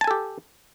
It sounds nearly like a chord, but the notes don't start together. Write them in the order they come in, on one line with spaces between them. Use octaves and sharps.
A5 G#5 A4 G4